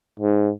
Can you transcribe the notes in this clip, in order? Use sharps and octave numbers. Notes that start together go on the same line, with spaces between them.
G#2